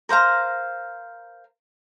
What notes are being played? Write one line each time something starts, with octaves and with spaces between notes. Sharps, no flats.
A#4 C5 F5 A#5